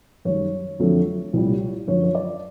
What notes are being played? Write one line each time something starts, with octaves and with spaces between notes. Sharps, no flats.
F#2 D#3 G3 C#5
F2 D3 F#3 A3 C4
C2 A#2 G3
F#2 D3 F3 C#5
C#5
D5